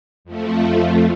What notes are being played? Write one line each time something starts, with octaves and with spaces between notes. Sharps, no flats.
F2 F3 A3